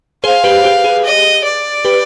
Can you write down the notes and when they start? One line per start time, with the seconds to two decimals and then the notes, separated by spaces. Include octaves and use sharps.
0.24 G#4 C5 F5
0.44 G4 B4
0.64 G4
0.84 G#4
1.05 D#5
1.44 D5
1.85 G4 B4